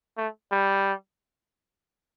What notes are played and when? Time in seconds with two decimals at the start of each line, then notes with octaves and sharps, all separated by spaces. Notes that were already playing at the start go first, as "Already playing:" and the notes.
0.18 A3
0.52 G3